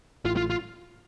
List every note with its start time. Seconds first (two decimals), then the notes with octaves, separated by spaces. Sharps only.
0.25 A1 A2 F4
0.37 F4
0.50 F4